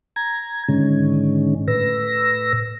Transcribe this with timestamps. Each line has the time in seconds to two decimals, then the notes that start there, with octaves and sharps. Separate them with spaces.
0.16 A#5 G#6
0.68 G#2 D3 D#3 G#3 C#4
1.68 A2 B4 E6 A#6